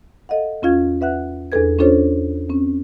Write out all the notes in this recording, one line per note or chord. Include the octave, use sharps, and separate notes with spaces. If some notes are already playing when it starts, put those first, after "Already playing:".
A4 D#5 F5 F#5
E2 C#4 F4 F5 G#6
B4 E5 F#5 F#6
E2 D4 G#4 A4 B4 G#6
C#4 D4 F4 A4 C5 C#5
C4 C#4